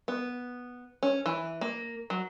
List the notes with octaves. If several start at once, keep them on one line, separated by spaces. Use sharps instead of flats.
B3
C#4
E3
A#3
F#3